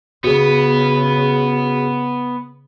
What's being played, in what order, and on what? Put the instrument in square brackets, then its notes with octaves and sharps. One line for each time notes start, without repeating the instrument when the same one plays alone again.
[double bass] C#3 [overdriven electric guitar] B3 [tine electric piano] F#4 G#4